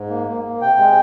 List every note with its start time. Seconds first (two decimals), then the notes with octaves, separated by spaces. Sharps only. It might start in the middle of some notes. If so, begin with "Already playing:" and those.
Already playing: G#2
0.10 A#3
0.27 A#3
0.43 A#3
0.61 C3 G5
0.78 G#3